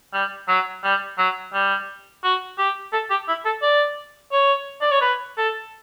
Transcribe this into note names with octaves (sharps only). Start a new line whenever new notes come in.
G3
F#3
G3
F#3
G3
F#4
G4
A4
G4
E4
A4
D5
C#5
D5
C#5
B4
A4